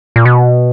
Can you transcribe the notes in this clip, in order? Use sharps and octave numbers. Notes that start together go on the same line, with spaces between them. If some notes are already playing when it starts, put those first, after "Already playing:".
A#2
B2